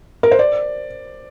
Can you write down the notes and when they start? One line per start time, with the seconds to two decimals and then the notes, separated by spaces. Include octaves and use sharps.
0.23 A#4
0.31 C5
0.39 D5